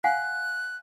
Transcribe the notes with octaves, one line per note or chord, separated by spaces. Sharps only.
F5 F#5 G#5 F#6